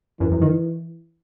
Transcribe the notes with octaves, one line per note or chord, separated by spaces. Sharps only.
F#2 E3
F#2
D#3